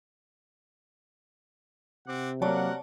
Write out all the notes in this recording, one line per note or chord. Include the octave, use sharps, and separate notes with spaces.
C3 C4 F#5 D6
F#3 A#3 A#4 C#5 D5 F#5 A5